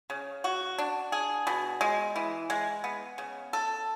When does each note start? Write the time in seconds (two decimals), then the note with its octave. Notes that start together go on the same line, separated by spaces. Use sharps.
0.10 C#3
0.44 F#4
0.78 D4
1.12 G#4
1.47 B2
1.81 G#3
2.16 E3
2.50 G#3
2.84 B3
3.18 C#3
3.53 A4